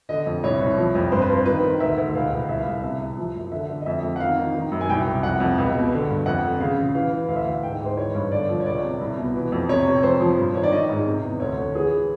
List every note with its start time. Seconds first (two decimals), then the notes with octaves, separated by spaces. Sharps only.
0.09 D3 D#5
0.26 F2
0.43 C2 C#5
0.61 C2
0.77 F3
0.95 F2
1.12 G2 C5
1.22 B4
1.29 G2 C5
1.46 D#3 B4
1.64 D#3
1.80 D2 E5
1.98 D2
2.15 C#2 F5
2.32 C#2
2.49 C2 E5
2.58 F5
2.66 C2 E5
2.84 C3 E5
3.00 C3
3.17 F3
3.35 F#2
3.52 D3 E5
3.69 D3
3.81 D#5
3.86 F2 E5
4.03 F2
4.16 F#5
4.20 D#3 F5
4.38 D#3
4.54 D#3
4.72 F#2
4.81 G#5
4.89 C2 G5
5.06 C2
5.23 F2 F#5
5.40 F2
5.58 C#2
5.75 B2
5.92 D3
6.09 G2
6.26 F2 F#5
6.44 D3
6.60 C#3 F5
6.78 C#3
6.94 E3 F5
7.12 E3
7.28 D2 F5
7.36 E5
7.43 F5
7.47 D2
7.63 G#2 G5
7.80 G#2
7.86 C5
7.97 E3 C#5
8.15 G2
8.32 D3 D5
8.49 F3
8.60 C#5
8.66 C#2 D5
8.83 C3
9.00 C2
9.18 B2
9.35 E3
9.52 F2
9.69 C3 C#5
9.86 C3
10.03 F2 C5
10.21 F3
10.38 G2
10.55 D#3 C#5
10.63 D5
10.72 D#3 D#5
10.89 G#2
11.06 C3
11.23 E2
11.40 D2 C#5
11.58 D3
11.75 E3 G#4
11.92 E3